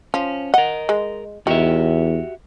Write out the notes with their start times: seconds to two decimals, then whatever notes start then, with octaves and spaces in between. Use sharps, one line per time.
0.14 F3 C#4
0.54 A#4 D#5 F#5
0.89 G#3
1.47 E2 D#3 F#4 G4 E5